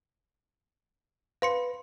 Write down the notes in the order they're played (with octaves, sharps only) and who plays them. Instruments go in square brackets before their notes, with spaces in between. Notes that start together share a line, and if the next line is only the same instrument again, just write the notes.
[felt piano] B4 [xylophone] F5 C6 C#7